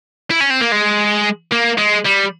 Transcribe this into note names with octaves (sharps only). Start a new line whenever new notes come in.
E4
C#4
C4
A#3
G#3
A#3
G#3
G3